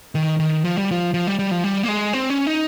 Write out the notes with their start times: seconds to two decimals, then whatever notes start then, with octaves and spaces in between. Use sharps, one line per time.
0.15 D#3
0.40 D#3
0.65 F3
0.78 G3
0.91 F3
1.14 F3
1.27 G3
1.39 G3
1.51 F3
1.64 G3
1.83 A#3
1.88 G#3
2.13 C4
2.30 C#4
2.47 D#4